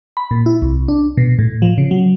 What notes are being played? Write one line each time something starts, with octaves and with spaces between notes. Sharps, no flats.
B5
A#2
E4
C2
D4
B2
A2
F3
C#3
F#3